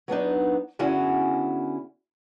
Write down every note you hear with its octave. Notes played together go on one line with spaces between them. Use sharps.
F#3 B3 D4 D#4
D3 B3 C#4 E4 F#4 G#4